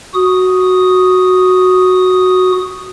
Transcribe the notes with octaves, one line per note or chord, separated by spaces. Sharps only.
F#4 D#6